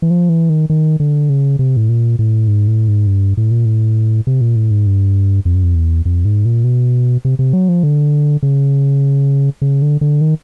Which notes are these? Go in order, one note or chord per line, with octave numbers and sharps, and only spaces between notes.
E3
F3
E3
D#3
D#3
D3
C#3
C3
A2
A#2
A2
G#2
A2
G#2
G2
A2
A#2
A2
C3
A#2
A2
G#2
G2
F2
F#2
F2
E2
F2
G#2
A#2
B2
C3
C3
F#3
F3
D3
C#3
C#3
D3
D3
D#3